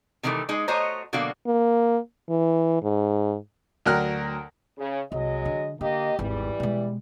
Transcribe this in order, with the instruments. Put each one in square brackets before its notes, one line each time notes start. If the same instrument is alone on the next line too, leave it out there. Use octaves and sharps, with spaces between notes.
[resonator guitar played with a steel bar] C3 D#3 E3 F#3 A3
G#3 D#4 G#4
A3 F#4 C5 C#5 D#5 A#5
B2 D3 F#3 A#3 F#4 F5
[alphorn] A#3
E3
G#2
[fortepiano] D2 F#3 A#4 G5 F6 F#6
[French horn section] C#3
[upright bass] C2 [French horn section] F#3 G#3 D#5
[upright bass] D3
[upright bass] D3 [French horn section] A#3 G4 D#5
[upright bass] G#1 E2 [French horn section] E3 G3
[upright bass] B2 G#3